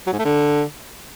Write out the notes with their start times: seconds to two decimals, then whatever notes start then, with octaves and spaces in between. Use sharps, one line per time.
0.07 F#3
0.13 G#2
0.19 A3
0.25 D3